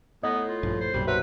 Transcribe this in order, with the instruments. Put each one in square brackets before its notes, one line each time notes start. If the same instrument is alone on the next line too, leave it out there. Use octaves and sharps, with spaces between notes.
[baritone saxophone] A2 [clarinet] B3 [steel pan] D#5
[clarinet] F4
[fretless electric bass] A#1 G2 F3
[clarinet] C5
[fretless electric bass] B1 F#2 A#2 [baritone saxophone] G3
[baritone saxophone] F#3 [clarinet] B4 [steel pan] C5 E5